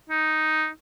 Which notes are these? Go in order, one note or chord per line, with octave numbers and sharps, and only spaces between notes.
D#4